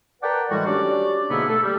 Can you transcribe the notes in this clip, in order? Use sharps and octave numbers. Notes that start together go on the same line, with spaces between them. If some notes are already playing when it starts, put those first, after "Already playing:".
A#4 B4 D5 F#5 G5 A5
A2 E3 G3 G#3 F#4
C#4 D4 F#4 G4 D5
G#2 B2 D3 A#3 B3 E4
A3 A4
G3